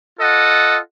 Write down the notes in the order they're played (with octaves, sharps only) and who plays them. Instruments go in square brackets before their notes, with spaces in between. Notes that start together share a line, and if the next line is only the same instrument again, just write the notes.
[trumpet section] F4 A4 D#5 F#5